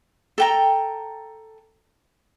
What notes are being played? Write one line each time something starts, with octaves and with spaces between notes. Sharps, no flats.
A4 G5 A#5